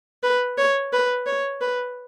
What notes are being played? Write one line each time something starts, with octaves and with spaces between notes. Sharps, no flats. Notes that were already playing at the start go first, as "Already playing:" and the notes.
B4
C#5
B4
C#5
B4